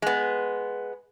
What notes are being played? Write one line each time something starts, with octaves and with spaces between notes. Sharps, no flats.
G#3 B3